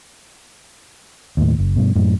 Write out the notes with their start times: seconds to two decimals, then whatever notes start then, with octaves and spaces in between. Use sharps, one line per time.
1.37 D#2 A2
1.58 F#1
1.76 G2 B2
1.96 F#2 A2